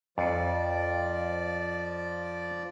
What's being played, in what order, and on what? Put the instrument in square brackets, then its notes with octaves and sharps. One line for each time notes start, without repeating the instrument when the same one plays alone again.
[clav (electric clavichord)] F2 [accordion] F3 D5